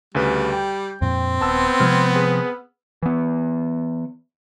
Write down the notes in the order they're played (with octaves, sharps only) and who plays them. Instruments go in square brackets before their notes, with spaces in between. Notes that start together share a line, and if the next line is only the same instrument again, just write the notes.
[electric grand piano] D2 C#3 B4 [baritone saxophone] G3
[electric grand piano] G5
[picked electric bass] F2 A#2 [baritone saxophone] C4
[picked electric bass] D#1 [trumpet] B3 [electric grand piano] A5 E6
[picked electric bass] C3 F3 G#3 [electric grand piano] F6 G#6
[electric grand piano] G#4 B4
[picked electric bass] E3 B3